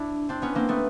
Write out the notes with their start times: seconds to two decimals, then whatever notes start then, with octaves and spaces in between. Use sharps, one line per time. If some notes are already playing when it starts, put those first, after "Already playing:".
Already playing: D4 E4
0.29 C4 D4
0.42 B3 C#4
0.55 A#3 C4
0.69 A3 B3